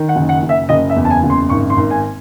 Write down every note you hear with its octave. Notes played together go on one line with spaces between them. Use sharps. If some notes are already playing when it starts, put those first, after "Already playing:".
Already playing: D#3
F#5
F#1
F#5
F#1
E5
F#1 D#5
E5
E2
A5
G#5
F#1
C6
G#1 C#6
C6
G#1
G#5